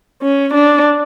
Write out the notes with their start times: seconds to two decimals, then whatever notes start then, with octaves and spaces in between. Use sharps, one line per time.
0.22 C#4
0.54 D4